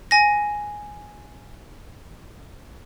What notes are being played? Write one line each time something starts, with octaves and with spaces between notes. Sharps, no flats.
G#5 A#6